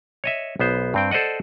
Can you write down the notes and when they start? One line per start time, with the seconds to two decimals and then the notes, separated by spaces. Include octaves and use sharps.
0.24 C#5 D#5 E5
0.59 B1 B3 C5
0.94 G2 C4 G5
1.11 A4 C5 D5 D#5 F#5